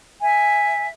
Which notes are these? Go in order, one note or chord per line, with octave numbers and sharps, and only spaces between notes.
E5 G#5